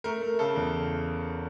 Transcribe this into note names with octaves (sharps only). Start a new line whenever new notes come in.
A3 A#4
A3
C#3 A4
E2